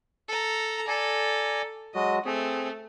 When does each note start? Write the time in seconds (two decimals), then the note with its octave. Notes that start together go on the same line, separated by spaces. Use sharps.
0.28 A4 A#5
0.88 A4 D5 G#5 A#5
1.95 F#3 G#3 F#4 D#5
2.26 A3 C4 G#4